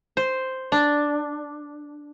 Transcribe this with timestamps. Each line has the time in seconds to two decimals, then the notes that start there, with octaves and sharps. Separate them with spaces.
0.17 C5
0.72 D4